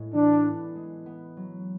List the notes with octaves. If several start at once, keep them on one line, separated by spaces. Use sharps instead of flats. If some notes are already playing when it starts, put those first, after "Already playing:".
Already playing: A2 G#3 B3
E3 D4
B3
G#3
B3
F#3